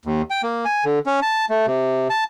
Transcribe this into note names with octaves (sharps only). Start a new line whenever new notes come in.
D#2
G5
A#3
G#5
D3
C#4
A5
A3
C3
A5